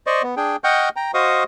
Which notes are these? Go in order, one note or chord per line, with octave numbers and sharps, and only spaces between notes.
C5 D5 D#5 C#6
B3
D4 G#4 G5
D#5 F#5 G5 C#6 F6 G6
G5 A#5
F#4 C5 D#5 F5 C#6 D#6